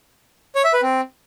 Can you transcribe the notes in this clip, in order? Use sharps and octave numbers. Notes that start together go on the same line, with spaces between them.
C#5
E5
B4
C4